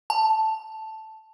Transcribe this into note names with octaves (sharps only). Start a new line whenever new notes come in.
A5